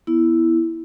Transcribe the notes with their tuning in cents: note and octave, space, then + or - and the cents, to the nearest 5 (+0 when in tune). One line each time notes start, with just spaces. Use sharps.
B3 -10 E4 +0